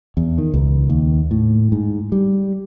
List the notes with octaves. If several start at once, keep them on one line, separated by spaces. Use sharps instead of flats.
E2
D#3
C#2
D#2
A2
G#2
G3